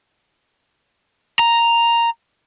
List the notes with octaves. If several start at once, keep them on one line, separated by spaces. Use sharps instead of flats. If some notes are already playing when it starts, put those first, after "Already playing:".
A#5